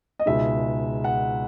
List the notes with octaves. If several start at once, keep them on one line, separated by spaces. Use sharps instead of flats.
D#5
C#2 B2 G#3 D#4 E5
F#5